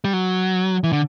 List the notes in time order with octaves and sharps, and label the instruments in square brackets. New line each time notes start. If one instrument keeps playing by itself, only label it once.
[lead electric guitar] G3
F#3
E3
D3